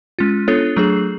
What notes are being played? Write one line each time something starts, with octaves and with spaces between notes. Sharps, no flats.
G#3 C#4 F4
B3 D4 F4 A4 C#5
F#3 A3 D4 G#4